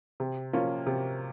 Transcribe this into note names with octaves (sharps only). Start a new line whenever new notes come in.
C3
F3 A#3 C#4 F4
C3